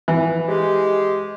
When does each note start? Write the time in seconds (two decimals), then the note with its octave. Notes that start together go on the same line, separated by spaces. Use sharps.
0.08 E3
0.48 G#3 G4